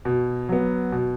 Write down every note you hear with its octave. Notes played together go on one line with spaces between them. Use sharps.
B2
F#3 B3
B2